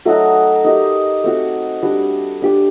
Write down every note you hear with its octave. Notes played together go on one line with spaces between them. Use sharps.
F#3 A3 D#4 F#4
D#4 G4 A#4
A3 C4 F#4
G3 D4 F#4
D4 G4 D5